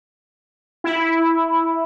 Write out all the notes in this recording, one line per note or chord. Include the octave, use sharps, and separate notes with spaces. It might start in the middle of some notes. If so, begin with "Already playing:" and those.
E4